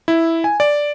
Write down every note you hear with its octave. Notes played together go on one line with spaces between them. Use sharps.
E4
G#5
D5